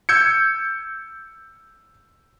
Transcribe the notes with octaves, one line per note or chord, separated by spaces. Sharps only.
E6 G6 G#6 C#7